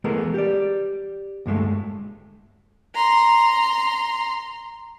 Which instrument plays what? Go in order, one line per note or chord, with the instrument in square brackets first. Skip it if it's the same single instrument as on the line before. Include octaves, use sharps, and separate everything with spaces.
[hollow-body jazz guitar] E3 G#3 A3 B3 G#4 A#4
G4 D5
D2 G2 G#3 A3
[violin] A#5 C6